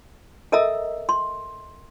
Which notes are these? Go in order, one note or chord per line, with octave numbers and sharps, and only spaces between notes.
A4 A#4 D#5 E5 A#5 E6
C6